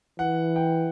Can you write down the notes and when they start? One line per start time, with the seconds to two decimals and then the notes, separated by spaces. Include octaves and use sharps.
0.19 E3 F#5
0.56 G5